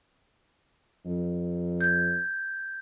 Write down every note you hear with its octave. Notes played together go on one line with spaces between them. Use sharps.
F2
G6 G#6